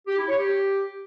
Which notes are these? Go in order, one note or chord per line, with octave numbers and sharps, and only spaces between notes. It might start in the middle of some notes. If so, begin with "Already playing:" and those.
G4
E4
C#5
G4